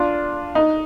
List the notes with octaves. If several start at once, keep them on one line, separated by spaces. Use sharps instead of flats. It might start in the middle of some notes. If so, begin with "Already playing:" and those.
Already playing: D4 F4
D#4